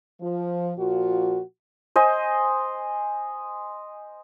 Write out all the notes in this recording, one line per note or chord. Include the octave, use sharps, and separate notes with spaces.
F3
A#2 F3 F4 F#4
C5 D#5 G#5